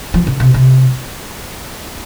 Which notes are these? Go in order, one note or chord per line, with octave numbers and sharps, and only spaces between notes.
F3
C#3
C3
C3